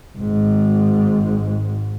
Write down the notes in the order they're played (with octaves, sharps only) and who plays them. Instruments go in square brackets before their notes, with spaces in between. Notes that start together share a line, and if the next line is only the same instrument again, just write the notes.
[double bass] G#1 G#2